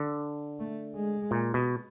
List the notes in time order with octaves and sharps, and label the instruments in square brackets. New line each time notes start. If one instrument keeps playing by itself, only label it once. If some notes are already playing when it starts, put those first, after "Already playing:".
Already playing: [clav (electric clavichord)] D3
[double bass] A3
G#3
[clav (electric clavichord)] A#2
B2